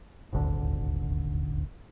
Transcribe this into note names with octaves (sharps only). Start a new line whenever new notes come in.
D#1 G#1 D2 D3